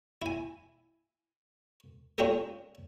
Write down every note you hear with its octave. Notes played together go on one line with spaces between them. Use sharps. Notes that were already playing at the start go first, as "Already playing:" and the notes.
E4 G#5
C#4 D4 F4 G4 A4 A#4